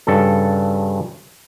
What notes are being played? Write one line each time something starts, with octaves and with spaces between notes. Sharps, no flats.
G2 C#3 A4